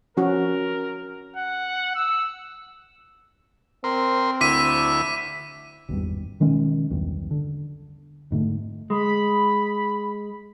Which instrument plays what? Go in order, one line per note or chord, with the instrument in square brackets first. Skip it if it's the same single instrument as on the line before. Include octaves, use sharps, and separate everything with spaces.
[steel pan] F3 C#4 F#4 [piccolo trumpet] A#4
[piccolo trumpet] F#5
E6
[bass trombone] C4 [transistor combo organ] A#4 C6
[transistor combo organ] D2 E4 [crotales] D6 B6 D#7
[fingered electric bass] G#1 E2 G2
B2 D#3 G#3 C#4
B1 E2 G2 D#3
D3
F1 G#2 D3 A3
[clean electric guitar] G#3 [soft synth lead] B5